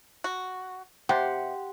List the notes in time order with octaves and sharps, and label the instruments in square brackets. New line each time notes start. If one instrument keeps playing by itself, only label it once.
[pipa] F#4
[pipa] C3 [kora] G4 [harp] F#5 C6